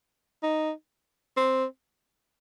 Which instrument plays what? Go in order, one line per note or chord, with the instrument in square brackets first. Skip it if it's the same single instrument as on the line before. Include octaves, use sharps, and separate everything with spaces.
[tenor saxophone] D#4
C4